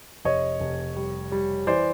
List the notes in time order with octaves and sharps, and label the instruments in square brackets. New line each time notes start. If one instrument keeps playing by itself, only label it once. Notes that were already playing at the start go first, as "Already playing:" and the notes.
[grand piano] F1 C#5 D#5
F1
G3
G3
E3 C5 D5